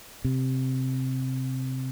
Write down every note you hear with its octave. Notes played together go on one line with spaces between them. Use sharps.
C3